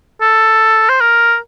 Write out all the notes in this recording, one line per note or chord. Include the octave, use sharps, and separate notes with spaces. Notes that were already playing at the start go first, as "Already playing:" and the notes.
A4
C5
A#4